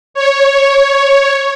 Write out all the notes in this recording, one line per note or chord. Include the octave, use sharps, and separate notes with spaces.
C#5